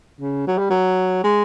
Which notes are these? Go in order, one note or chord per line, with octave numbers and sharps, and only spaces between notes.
C#3
F#3
G3
F#3
G#3